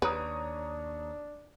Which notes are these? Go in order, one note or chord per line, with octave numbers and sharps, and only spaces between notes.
D#2 D4 B4 C#5 A#5 D#6